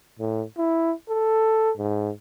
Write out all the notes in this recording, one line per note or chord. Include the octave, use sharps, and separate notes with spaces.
A2
E4
A4
G#2